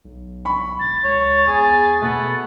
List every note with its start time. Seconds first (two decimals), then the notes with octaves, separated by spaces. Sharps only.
0.05 B1
0.45 B5 C#6
0.80 E1 A6
1.04 C#2 C#5
1.47 E2 G#4
2.02 B2 A3 B3